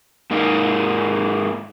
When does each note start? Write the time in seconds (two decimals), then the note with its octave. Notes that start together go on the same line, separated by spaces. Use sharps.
0.31 G#2 A#3 D#4